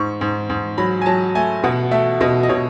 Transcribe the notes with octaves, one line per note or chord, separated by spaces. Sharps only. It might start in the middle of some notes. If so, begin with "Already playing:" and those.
Already playing: G#2 C#6
G#2
G#2
F#3 B5
G#5
F#3 A5
A3 G#5
B2 F#5
A3 E5
B2 D#5
D#5
B2 C#5